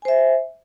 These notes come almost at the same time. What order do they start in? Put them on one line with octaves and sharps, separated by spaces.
G#5 C5 E5